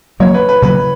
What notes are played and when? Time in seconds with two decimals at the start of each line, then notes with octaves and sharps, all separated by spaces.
0.19 C#3 F#3 A#3 C#5
0.34 B4
0.49 B4
0.62 C#3 F#3 A#3 B4